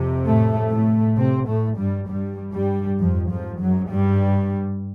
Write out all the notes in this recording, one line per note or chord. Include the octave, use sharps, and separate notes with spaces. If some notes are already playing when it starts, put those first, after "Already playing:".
Already playing: F2 C3
A2 A3
A2 A3
C3 C4
A2 A3
G2 G3
G2 G3
G2 G3
F2 G#2 F3
F2 F3
F#2 F#3
G2 G3